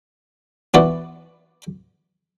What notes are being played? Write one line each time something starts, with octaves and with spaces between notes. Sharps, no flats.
E3 B3 F#4 B4 D5